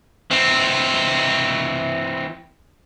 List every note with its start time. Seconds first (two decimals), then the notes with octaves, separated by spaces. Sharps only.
0.31 E3 C4